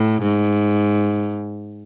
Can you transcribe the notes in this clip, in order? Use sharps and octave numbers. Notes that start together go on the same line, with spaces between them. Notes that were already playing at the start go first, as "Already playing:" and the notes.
Already playing: A2
G#2